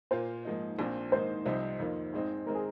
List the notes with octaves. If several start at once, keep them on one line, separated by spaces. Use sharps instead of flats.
A#2 A#3 F4 C5
G#2 F3 A#3 D#4
A#1 A#2 F3 C4
G#2 D#3 A#3 D#4 C5
C2 C3 F3 C4 D#4
F2 D#3 A#3 F4
G#1 G#2 G#3 C4 D#4
D#3 G#3 C4 A#4
G#4